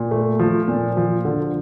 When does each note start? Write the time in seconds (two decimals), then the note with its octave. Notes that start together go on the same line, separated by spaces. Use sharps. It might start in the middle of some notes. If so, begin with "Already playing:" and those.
Already playing: A#2
0.11 A3
0.39 F3
0.68 A#2
0.97 F3
1.25 D3